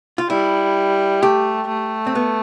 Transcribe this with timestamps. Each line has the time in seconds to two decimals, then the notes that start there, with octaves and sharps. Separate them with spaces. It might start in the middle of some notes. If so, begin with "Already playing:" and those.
0.18 F4
0.29 G3 E4
1.22 A3 G4
1.68 A3
2.07 C4
2.15 B3